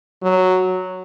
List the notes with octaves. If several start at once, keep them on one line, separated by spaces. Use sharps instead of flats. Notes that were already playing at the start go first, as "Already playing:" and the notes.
F#3